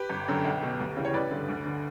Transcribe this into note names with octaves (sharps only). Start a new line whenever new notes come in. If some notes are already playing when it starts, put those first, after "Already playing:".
Already playing: G4 B4
G1
F#2 D3
B1
B2
D2
C#3 E3
C#5
A1 B4 D5
G2 D3
D2
D3